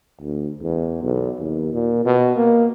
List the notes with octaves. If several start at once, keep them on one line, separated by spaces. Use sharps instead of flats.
D2
E2
B1
D#2
A#2
B2
A#3